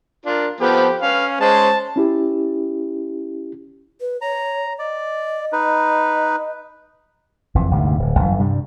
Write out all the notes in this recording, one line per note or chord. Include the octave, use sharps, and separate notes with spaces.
D4 F4 A#4
F3 B3 G4 A4
C#4 B4 F5
G#3 C#4 C5 A5
C#4 E4 G4
B4
C#5 A#5
D5 D#5
D#4 B4
F#1 F2 E3
G1 D2 G#2 C3
D1
G1 F#2 E3
G2 C3 G3